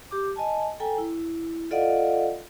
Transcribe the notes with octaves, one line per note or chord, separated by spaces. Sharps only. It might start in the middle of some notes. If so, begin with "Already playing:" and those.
G4 D6
D#5 G#5 A5
A4 G5 G#5 A#5
E4
F4 A4 D5 D#5 F5 F#5